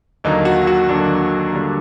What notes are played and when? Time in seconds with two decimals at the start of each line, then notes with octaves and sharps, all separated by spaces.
0.24 D#2 D3 F#3 A#3 D#4
0.45 F#4
0.67 F#4
0.89 D#2 D3 F#3 A#3 D4
1.53 D3 G3 A#3